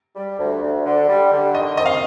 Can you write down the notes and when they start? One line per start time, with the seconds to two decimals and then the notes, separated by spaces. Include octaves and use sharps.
0.16 G3
0.39 D2
0.63 D2
0.86 D3
1.09 G3
1.32 D3
1.54 D#3 D#5
1.77 F2 D#5
1.86 F5